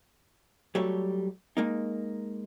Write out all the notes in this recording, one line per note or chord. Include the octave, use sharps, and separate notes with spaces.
F#3 G3 A3 A4 C#5
G#3 A#3 D#4